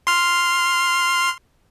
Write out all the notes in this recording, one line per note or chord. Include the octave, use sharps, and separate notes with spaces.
C6 F6